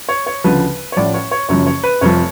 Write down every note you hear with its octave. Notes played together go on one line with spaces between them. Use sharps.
C#5
C#5
D2 C#3 F3 B4
C#5
A1 A2 F3 D5
C#5
C#5
F#1 F#2 C#3 F3 C#5
C#5
B4
F1 F2 F3 C#5